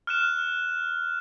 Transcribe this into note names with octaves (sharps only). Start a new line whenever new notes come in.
F6 F#6 E7